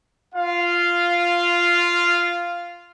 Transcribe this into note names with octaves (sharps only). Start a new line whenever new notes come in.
F4 F5